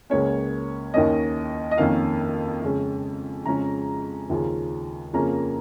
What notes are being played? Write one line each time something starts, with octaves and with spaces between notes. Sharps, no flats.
C#2 C#3 A#3 C#4 C#5
D#2 D#3 A#3 C#4 D#5
D#5
F2 D#3 A#3 C#4 F5
F2 C#3 G#3 C#4
F2 C#3 F3 G#3 C#4 A#5
D#2 C#3 F3 C#4
F2 C#3 F3 A#3 C#4 A#5